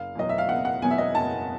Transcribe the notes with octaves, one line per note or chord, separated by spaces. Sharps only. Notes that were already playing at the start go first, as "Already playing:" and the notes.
Already playing: F#1 F5
E2 B2 F#3 D#5
E5
F5
F#1 F#5
F#5
E2 B2 F#3 G#5
E5
D#5
F#1 A5